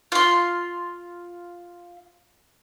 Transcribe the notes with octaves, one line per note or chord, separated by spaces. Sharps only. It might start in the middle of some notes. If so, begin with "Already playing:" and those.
F4 C6